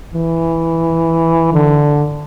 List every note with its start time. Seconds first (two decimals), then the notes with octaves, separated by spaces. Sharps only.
0.15 E3
1.54 D3